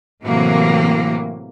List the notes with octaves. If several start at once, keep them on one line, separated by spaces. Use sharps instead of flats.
A2 C3 E3 F#3 A#3